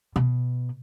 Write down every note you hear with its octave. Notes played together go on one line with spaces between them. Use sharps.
B2